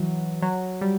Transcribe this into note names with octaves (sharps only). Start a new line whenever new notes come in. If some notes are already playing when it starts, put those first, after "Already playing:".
Already playing: E3 F#3
F#3
G3